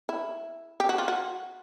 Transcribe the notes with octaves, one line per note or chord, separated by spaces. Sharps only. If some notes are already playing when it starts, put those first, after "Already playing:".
E4
G4
F#4
F4
F#4